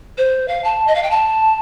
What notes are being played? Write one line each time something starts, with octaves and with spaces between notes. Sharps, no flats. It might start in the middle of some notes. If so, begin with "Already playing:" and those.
C5
F5
A5
D#5
F5
G5
A5